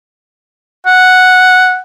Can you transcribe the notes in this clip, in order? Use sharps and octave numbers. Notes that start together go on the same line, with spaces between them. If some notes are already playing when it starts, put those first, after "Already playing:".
F#5